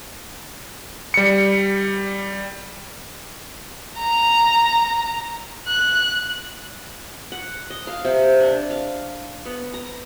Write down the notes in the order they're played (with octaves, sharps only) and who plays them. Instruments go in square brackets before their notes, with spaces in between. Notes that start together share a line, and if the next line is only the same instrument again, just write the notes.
[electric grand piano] G3 C#7
[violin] A#5
F#6
[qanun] F#5
D#5
F5
C3
D4
F5
B3
A#5